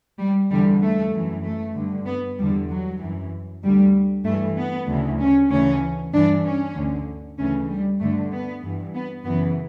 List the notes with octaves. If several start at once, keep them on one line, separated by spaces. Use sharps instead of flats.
G3
E2 D3 G3
A3
F#2 E3
A3
G2 D3
B3
E2 D3 G3
F#3
F#2 E3
D2 D3 G3
G2 E3 A3
B3
D2 C#3 E3
C#4
D2 C#3 E3 C#4
G2 E3 D4
C#4
D2 D3
D2 C#3 E3 C#4
G3
G2 D3 A3
B3
G2 E3
B3
F#2 C#3 E3 B3